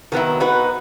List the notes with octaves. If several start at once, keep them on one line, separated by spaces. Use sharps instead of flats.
D#3 F#3 B3 E4
B3 D#4 F#4 B4